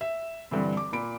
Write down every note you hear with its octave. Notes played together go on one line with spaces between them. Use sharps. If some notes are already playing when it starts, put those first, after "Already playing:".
E5
G2 D3 E3 C4
D6
A#2 B5 D7